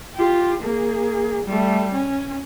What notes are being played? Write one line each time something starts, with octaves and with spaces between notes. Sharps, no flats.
F4 G4
A#3 G#4
G3 A3
C#4